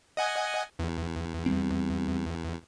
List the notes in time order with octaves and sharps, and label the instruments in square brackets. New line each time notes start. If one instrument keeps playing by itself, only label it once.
[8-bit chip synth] D#5 F#5 G#5
E2
[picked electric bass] G3 G#3 C4